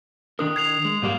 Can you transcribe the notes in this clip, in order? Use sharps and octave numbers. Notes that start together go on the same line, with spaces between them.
D#3 D4 A#4 D#6
G#6 C7 F7
G#3
G#2 G3 A#3